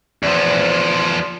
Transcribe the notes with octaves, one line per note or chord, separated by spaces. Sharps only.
E2 F3